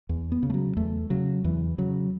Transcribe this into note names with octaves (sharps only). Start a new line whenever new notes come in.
E2
B3
C#3
A3
F#3
E2 A3
C#3 F#3
E2 E3
C#3 F#3